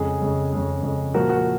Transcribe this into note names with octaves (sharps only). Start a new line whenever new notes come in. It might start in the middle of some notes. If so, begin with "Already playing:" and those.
Already playing: F2 C#3 G#3 G#4
F2 C#3 G#3
F2 C#3 G#3
F2 C#3 G#3
A#2 F3 A#3 F#4 A#4
F#4